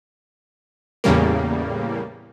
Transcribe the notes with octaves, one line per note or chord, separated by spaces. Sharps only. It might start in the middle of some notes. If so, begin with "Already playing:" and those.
E2 A2 C#3 G3 A#3